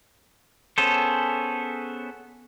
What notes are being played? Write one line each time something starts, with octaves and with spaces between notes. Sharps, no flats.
B3 C#4 G#4 A4 C5